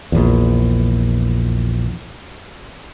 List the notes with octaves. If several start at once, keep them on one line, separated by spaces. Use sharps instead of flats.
A#1 E2